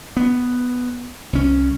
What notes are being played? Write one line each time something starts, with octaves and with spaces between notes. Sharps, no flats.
B3
C2 C#4